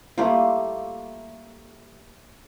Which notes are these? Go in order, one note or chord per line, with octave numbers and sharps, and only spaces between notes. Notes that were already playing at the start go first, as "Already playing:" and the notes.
G3 A3 A#3 F4